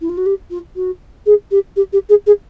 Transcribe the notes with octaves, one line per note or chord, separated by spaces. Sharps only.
E4
F4
F#4
G4
F4
F#4
G#4
G4
G4
G4
G#4
G#4